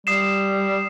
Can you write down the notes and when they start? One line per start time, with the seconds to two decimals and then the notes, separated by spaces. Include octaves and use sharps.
0.07 G3 D#6 C7 E7